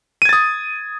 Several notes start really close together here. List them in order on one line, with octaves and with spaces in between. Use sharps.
D#7 G#6 A6 D#6